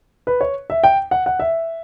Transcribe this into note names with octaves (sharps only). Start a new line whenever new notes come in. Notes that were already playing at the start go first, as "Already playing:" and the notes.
B4
C#5
E5
G5
F#5
F#5
E5